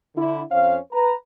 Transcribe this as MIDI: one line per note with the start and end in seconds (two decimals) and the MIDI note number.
0.17 0.42 50
0.17 0.42 64
0.51 0.78 41
0.51 0.78 61
0.51 0.78 72
0.51 0.78 77
0.93 1.15 71
0.93 1.15 82